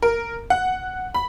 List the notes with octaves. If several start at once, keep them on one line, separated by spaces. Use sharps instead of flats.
A#4
F#5
B5